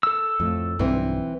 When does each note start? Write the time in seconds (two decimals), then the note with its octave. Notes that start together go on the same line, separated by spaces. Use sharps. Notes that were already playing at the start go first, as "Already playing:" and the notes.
0.03 A4 E6
0.40 F2 A2
0.79 B1 G2 E3 C4